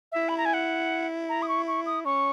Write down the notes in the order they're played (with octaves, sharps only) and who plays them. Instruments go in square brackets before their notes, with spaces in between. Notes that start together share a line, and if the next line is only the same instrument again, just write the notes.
[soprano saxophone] E4 [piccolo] E5
[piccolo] B5
A#5
G#5
F#5
A#5
D#6
C#6
C#6
D#6
[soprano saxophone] C#4 [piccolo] C#6